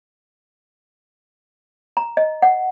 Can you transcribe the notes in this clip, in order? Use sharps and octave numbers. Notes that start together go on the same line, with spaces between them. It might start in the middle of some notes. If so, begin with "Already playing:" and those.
A#5
D#5
F#5